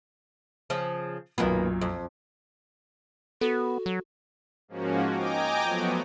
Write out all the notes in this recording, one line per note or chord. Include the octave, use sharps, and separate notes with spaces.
C#3 F3
B1 F#2 A#2 D#3 A#3 B3
F2
B3 F#4 A4
F#3
G#2 F3 A#3 C#4 F#4
D#5 G5 G#5 A#5 D6
F3 F#3 A3 B3 F#4